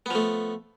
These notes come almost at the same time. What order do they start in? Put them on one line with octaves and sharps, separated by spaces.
B3 F3 A3